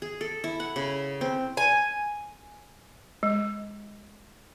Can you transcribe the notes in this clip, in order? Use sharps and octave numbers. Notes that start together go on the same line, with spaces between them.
G#4
A4
E4
F#5
C#3
C4
G#5
G#3